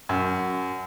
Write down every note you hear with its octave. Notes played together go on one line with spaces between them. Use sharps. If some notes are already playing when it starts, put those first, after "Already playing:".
F#2